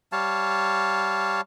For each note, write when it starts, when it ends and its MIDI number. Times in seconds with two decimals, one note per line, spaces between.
0.12 1.41 55
0.12 1.41 73
0.12 1.41 77
0.12 1.41 81